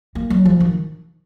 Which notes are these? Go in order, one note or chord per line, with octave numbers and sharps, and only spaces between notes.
A#3
F#3
F3
D#3